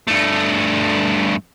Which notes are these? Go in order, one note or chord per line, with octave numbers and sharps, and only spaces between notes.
G2 A3